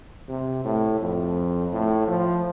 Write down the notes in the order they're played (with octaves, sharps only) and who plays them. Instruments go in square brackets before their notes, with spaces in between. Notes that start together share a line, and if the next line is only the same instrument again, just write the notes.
[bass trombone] C3
A2
F2
A2
F3